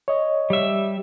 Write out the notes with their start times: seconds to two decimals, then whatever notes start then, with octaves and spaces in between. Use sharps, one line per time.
0.08 C#5 D#5
0.50 G3 E5